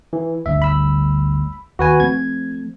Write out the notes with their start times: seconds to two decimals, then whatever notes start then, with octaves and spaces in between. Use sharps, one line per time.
0.13 E3
0.46 G1 D2 G2 E5
0.62 B5 E6
1.79 D#2 F#4 B4 G#5
2.00 F3 A3 C4 G#6